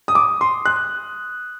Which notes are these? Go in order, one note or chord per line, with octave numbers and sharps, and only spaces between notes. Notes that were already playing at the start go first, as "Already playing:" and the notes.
D#6
D6
C6
F#6